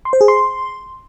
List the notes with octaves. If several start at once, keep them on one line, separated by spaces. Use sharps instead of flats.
C6
C5
G#4
C6